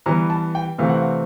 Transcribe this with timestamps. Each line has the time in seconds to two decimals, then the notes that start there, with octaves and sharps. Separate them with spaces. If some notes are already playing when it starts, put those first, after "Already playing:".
0.06 E3 G3 B3 A#5
0.30 A5
0.55 G5
0.78 C3 E3 A3 C4 F5
0.89 F#5
0.98 F5